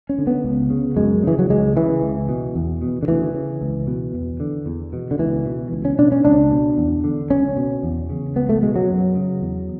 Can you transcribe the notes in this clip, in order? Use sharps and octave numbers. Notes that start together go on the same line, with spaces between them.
C#4
D3
B3
C#2
C#3
F#2 G#3
C#3 E3
F#3
C#2 G#3
C#3 E3
C#2
B2
E2
B2
D3
D2 E3
C#3
C#2
B2
E2
D3
E2
B2
D3
C#2 E3
B2
C#2
C#4
B2 D4
C#4
C#2 D4
B2
E2
D3
C#2 C#4
B2
E2
C#3
C#2 B3
A3
B2 G#3
F#3
F#2
C#3
E2